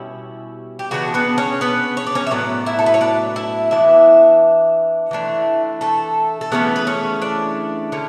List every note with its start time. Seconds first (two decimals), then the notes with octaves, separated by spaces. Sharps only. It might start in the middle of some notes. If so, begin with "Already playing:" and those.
Already playing: B2 G3 C#4 E4
0.79 G4
0.91 C#3 E3 B3 D4 F#4
1.14 B3 B4
1.38 C#4 C#5
1.61 B3 B4
1.97 C#5
2.07 D5
2.15 C#4 C#5
2.27 E5
2.31 A2 F#3 B3 D5
2.66 E4 E5
2.79 A4
2.86 B4
2.94 C#5
3.01 D4 D5
3.36 E4 E5
3.71 E3 B3 D4 E4 E5
5.11 E3 A3 D4
5.81 A3 A4
6.41 A4
6.52 C#3 E3 A3 B3 C#4 B4
6.76 B4
6.87 C#4 C#5
7.22 D4 D5
7.92 D3 A3 C#4